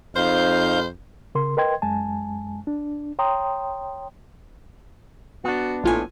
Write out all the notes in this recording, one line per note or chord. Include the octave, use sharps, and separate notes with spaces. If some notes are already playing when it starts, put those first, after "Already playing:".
F2 D#4 C5 F5 G6
C#3 A#4 C6
A#4 B4 D#5 G5 C6 G#6
F#2 G#3 G#5 A5
D4
C#5 G5 A#5 C6 D#6
B3 D4 F#4
A#1 A2 F4 G#5